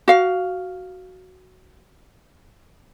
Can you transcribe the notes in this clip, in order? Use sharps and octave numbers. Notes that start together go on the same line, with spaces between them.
F#4 F5